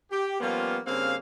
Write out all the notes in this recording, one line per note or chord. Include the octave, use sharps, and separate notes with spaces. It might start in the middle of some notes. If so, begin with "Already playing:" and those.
G4
F3 G3 A#3 B3 C#4 F4
G2 C#3 A#3 C4 F5